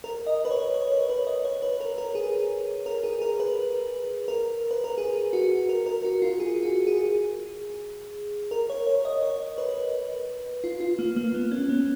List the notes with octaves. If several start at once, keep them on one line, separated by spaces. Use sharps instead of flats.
A#4
D#5
B4
C#5
C#5
C#5
B4
D#5
C#5
B4
A#4
A#4
G#4
A#4
G#4
A#4
B4
A#4
B4
A#4
G#4
F#4
A#4
A#4
F#4
F4
G#4
F#4
G#4
A#4
C#5
C#5
D#5
C#5
B4
F4
F4
A#3
A#3
B3
C#4
B3